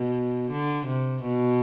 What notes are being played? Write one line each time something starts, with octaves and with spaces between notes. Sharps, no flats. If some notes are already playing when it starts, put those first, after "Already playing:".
Already playing: B2
D3
C3
B2